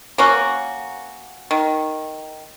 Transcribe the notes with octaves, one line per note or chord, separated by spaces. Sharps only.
A#3 C#4 F#4
D#3